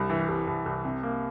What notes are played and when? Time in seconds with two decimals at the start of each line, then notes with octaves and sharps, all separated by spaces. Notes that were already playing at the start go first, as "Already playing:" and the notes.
Already playing: C2 G3
0.10 E3
0.28 C2
0.47 C2
0.66 C2
0.85 C3
1.03 A#3